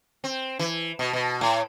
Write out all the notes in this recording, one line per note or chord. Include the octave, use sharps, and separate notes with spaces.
C4
E3
B2
B2
A2